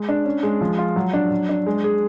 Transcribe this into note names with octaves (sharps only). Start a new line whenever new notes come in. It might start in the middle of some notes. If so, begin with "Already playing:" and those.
Already playing: G#3
D4
C#4
G#3
F3
F4
F#3
D4
F#3
D4
G#3
G#4